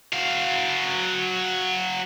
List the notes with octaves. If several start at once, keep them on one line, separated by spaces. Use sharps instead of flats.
F#3 F5